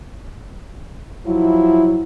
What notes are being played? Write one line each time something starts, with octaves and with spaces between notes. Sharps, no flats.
F3 F#3 E4